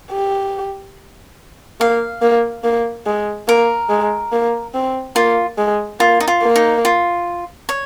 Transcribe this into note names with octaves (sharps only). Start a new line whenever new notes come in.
G4
A#3 F5
A#3
A#3
G#3
A#3 A#4
G#3
A#3
C4
A#3 F4
G#3
A#3 F4
D#4
F4
A#3
D#4
F4
C#5